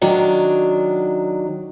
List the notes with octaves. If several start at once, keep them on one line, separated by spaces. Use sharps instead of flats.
D#3 F#3 D4